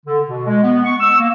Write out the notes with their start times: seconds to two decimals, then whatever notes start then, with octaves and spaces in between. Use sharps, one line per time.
0.06 D3
0.28 B2
0.47 G#3
0.64 B3
0.85 C#6
1.00 E6
1.19 A#3